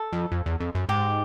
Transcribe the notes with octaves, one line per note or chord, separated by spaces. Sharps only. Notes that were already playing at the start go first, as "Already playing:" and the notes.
Already playing: A4
F2
F2
E2
F2
F#2
G#2 G4